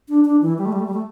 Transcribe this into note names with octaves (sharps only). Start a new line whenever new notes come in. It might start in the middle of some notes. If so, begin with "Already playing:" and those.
D4
D4
E3
G3
A3
G3
A3
G3
A3